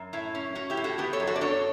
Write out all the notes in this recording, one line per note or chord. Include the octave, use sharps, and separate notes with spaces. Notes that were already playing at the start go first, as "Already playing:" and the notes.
Already playing: F#2
A2 E4
C#4
C#4 F#4
E4 G4
A2
F#4 A4
B3 G4 B4
A4 C#5
F#2
F#4 A4
D5
D4 A4 C#5